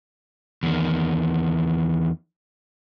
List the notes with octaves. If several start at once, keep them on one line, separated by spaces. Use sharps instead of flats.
E2 D#3